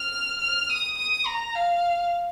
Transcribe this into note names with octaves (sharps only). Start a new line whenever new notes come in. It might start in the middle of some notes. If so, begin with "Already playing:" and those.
Already playing: F6
F6
D#6
D#6
A#5
F5